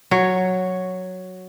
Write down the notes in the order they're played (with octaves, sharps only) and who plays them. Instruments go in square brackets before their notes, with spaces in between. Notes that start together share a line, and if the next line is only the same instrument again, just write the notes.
[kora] F#3 C#5